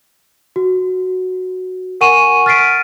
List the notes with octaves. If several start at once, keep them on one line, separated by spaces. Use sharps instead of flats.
F#4
A#4 F#5 G#5 C#6 D#7 E7
F6 A6 B6 C7 D7 D#7